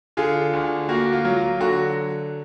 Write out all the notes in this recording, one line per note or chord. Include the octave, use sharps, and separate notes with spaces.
D3 F4 G#4
D2
A#3 F#4
F4
F#3
F4
D3 F#4